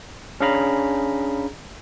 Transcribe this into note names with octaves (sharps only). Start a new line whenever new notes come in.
C#4 D4 G#4 F5 A#5 B5